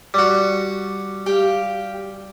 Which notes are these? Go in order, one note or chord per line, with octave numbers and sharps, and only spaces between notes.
G3 F#4
G4 F5 G5